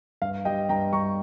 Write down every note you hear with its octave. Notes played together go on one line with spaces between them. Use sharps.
G2 F5
G3 D#5 G5
G2 G5 A#5
G2 A#5 C#6